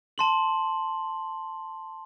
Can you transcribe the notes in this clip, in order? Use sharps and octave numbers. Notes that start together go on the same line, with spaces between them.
A5 C6 F#7